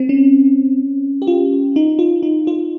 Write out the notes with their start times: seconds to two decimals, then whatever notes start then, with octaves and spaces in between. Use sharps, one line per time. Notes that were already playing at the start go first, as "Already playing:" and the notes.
Already playing: C4
0.09 C#4
1.22 G4
1.27 F4
1.76 D#4
1.99 F4
2.23 D#4
2.47 F4